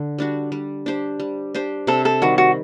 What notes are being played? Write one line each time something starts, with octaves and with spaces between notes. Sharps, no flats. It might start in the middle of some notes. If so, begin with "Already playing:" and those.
Already playing: D3
G3 D4 F#4
G3
D4 G4 C5
G3
D4 G4 C5
C3 A4
A4
D#3 G3 F#4
F#4